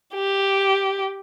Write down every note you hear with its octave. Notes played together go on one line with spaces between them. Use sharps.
G4